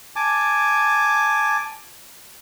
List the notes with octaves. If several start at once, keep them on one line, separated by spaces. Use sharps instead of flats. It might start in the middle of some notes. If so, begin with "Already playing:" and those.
G#5 A5 D6